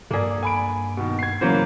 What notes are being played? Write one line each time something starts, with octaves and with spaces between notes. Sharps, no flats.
G2 A#3 G#4 A4 D5
G#5 B5 D7
B2 D#3
G#6 C7
C#3 E3 F#3 A#3 C5